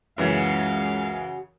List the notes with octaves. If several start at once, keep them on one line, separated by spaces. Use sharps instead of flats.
C#2 F#2 C#3 E3 F#3 F5